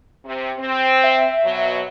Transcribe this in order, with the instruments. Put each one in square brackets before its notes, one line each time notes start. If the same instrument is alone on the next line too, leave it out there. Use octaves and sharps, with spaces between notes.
[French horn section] C3
C4
[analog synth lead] E5
[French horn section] B2 F#3